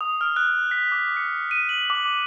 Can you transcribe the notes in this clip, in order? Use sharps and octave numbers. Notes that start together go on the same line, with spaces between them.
D#6
F6
F#6
B6
D6
C#7
D#7
F#7
D6